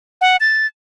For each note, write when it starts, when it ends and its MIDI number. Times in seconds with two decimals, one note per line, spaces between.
0.21 0.37 78
0.40 0.67 93